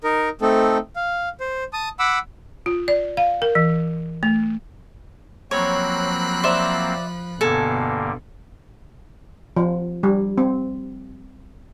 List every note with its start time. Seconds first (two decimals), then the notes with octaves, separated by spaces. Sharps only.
0.04 D#4 A#4
0.41 A3 C4 D#4 A4
0.96 F5
1.40 C5
1.73 A5 D#6
1.99 F#5 B5 D6 E6
2.66 F4
2.88 D5
3.17 F5
3.42 A#4
3.55 E3
4.23 A3
5.51 F3 F#3 A#3 C4 C#5 B5 F#6
6.44 C5 D5 E5
7.41 G2 B2 D3 A#3 A4 G#5
9.56 F3
10.03 G3
10.38 C4